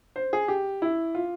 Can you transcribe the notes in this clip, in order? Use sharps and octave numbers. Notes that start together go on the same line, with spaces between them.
C5
G#4
G4
E4
F4